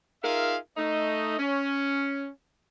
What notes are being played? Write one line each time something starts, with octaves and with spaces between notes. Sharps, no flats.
D#4 F4 G#4 A#4 E5 F5
A3 D#4 D#5
C#4